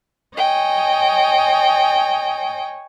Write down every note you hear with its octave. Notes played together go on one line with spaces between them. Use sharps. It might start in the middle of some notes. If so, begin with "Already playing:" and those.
C#5 D#5 G5 G#5